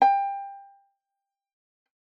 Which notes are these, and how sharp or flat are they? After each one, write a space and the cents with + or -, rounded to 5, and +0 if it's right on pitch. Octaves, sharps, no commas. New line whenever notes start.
G5 +20